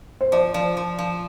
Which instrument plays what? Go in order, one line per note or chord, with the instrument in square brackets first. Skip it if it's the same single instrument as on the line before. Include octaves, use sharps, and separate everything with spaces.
[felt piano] C5
[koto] F3 [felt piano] D5
[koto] F3
F3
F3